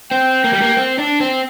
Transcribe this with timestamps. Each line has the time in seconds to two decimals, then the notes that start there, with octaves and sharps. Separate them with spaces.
0.11 C4 G5
0.44 A#3
0.53 G3
0.61 A#3
0.77 C4
0.98 D4
1.21 C4